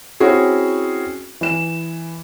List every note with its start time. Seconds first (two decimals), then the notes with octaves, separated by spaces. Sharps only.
0.20 C4 C#4 E4 F#4 G#4
1.41 E3 E7